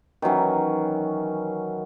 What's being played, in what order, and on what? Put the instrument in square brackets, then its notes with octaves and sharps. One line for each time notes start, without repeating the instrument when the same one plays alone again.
[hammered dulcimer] D#3 E3 F#3 C#4